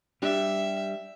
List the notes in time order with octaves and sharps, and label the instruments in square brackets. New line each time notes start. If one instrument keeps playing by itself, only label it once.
[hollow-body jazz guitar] G3 D4 G4 [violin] E5